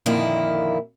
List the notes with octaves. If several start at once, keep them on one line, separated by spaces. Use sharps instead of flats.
F2 A#2 D3 D#3 A#3 E4